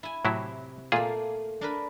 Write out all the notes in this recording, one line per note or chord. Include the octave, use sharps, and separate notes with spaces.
E4 G#5
A2 C3 F#3 E4
A#2 A3 A#3 F4 G#4
D4 A#4 B4